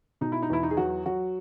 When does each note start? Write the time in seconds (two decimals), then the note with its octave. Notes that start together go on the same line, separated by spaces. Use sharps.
0.21 B2 D#4
0.32 E4
0.42 D#4
0.50 E2 E4
0.63 D#4
0.71 G#4
0.77 F#3 F#4
1.06 F#3 F#4